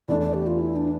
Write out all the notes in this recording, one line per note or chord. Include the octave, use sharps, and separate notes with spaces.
E2 E3 A3 D4 D5
D5
G4
F4
E4
D4